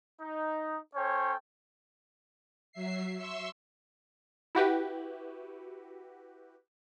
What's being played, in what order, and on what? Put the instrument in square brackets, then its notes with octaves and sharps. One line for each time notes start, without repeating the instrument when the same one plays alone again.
[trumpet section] D#4
C#4 A4 C5 C#5 G5
[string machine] F#3 E5 C7
E5 C6 C#6 E6
[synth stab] E4 F#4 G4 B4